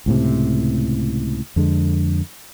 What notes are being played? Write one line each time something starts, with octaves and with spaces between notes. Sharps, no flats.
C#2 A2 C3
F2 D3 G#3